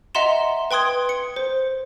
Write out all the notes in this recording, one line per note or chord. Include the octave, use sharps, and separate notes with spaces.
D#5 E5 F#5 A#5 C6 E7
B4 G5 C6 D#6 G#6
C#7
C5